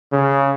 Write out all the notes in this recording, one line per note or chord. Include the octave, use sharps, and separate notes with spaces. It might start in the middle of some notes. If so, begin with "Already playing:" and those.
C#3